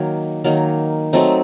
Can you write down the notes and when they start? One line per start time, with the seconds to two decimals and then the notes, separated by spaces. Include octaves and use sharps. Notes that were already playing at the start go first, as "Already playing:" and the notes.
Already playing: D#3 F#3 A#3
0.44 D#3 F#3 A#3
1.13 F#3 A3 C4 D#4